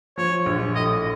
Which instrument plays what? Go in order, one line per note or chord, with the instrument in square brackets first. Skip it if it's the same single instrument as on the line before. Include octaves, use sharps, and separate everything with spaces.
[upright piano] F3 [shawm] C#5
[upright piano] A#1
[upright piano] A2 [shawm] D#5